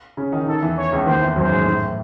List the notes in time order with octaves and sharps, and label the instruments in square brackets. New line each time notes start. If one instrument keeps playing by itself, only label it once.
[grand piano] C#3 C#4
D#3 D#4
[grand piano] D#3 D#4 [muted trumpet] A4
[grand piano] E2 E3
[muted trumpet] C#5
[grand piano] C#2 C#3
[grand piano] D#2 D#3 [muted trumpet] C5
[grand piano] E2 E3
[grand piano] F#2 F#3 [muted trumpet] C5
[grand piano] G#2 G#3
A2 A3